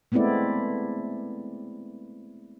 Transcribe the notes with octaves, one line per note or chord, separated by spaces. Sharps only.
G#3 A3 B3 C4 E4 D5